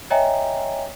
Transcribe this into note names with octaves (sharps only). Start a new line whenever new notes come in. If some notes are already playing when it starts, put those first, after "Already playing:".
C#5 D#5 E5 G5 G#5 A#5